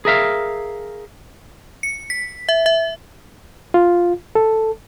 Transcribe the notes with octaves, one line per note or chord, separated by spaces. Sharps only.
G#4 A#4 E5 F5
C#7
B6
E5
E5
F4
A4